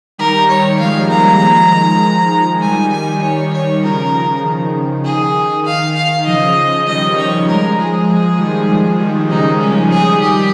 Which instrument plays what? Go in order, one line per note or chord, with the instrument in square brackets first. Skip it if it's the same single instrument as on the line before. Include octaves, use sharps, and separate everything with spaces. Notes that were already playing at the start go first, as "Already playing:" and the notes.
[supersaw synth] D#3 G3 [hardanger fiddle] A#4
[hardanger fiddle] C#5
[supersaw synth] F3 G#3 [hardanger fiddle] F5
[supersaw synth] G3 A#3 [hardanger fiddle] A#5
[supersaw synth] F3 G#3
D#3
D#3
[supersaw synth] D#3 G3 [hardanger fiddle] G#5
[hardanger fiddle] G#5
C#5
C#5
[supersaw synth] C#3 F3 [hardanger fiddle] A#4
[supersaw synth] D#3
[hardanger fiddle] G#4
F5
F5
[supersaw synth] C#3 F3 [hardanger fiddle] D#5
[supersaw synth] D#3 G3 [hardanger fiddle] D#5
[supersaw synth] D#3 G3 [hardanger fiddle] C#5
[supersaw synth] F3 G#3 [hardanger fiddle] A#4
[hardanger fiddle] G#4
[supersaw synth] F3 G#3
D#3 G3
F3 G#3
D#3 G3
[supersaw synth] C#3 F3 [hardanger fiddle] D#4
[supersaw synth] C#3 F3 [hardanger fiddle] C#4
[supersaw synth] D#3 G3 [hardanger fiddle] G#4
[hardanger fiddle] G4